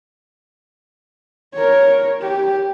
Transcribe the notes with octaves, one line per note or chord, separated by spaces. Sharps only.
A#4 C#5
G4